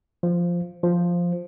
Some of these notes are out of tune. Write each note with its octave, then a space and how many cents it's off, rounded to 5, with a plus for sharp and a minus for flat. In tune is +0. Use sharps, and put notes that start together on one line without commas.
F3 -5
F3 +0